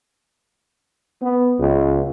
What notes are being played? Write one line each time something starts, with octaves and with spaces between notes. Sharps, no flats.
B3
C#2